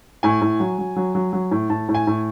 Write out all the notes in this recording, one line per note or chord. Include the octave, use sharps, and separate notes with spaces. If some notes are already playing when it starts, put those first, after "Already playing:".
A2 G#5
A2
F#3
F#3
F#3
F#3
F#3
A2
A2 A5
A2
G#5
A2